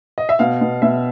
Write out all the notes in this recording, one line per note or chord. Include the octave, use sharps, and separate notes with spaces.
D#5
E5
B2 F5
B2
B2 E5